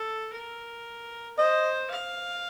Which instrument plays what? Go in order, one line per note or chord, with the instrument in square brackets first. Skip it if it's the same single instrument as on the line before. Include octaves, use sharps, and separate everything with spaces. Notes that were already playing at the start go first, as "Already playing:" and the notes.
Already playing: [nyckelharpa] A4
A#4
[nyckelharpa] C5 [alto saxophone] D#5
[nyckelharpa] F5